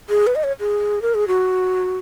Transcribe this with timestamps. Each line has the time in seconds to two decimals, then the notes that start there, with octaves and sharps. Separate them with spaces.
0.09 G#4
0.27 B4
0.35 D#5
0.43 C#5
0.60 G#4
1.02 A#4
1.14 G#4
1.28 F#4